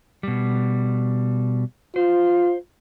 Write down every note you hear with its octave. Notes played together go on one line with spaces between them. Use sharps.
B2 G3
F4 C5